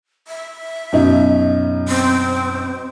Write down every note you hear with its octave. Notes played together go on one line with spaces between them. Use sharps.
E5
F#2 B2 D#4
C4